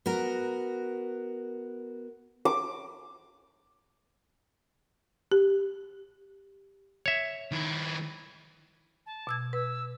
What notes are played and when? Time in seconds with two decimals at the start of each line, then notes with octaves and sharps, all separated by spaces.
0.06 B3 F#4 A#4
2.45 D6
5.32 G4
7.06 C#5 E5
7.51 D#3 E4
9.06 A5
9.27 B2 E6 G#6
9.53 B4 E6